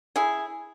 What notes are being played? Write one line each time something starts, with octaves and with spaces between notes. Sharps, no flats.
E4 G#4